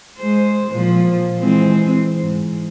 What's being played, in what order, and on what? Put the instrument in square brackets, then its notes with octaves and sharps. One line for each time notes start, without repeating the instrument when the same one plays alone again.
[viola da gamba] G#3 C5
A#2 F3
E3 G#3 C4
G#2